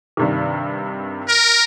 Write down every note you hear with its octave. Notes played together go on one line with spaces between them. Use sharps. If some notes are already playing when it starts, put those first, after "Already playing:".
G2 C3 D#3
A#4